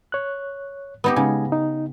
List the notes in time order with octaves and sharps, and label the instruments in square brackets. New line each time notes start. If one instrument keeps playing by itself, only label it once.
[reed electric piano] C#5 F#6
[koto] B3 D#4 G4
[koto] C#3 [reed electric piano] G#3 D#4 G#5
[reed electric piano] D#4